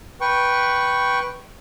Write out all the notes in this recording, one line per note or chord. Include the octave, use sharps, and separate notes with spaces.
B4 G5 C#6